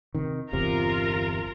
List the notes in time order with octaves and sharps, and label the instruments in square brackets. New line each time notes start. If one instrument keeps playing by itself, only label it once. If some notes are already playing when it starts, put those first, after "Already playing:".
[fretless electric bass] C3 D#3
[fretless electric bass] G1 E2 C3 [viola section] F4 A#4 A#5